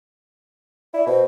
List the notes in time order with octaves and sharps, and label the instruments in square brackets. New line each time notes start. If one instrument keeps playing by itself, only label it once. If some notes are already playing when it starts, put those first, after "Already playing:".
[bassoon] E4 [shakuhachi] D5
[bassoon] B2 [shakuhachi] C5